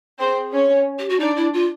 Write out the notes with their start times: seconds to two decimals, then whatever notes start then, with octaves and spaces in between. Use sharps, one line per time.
0.19 C4 G#4 C5
0.53 C#4 C#5
0.98 G4
1.09 F#4
1.19 D4 D#4 D5
1.36 E4
1.53 F4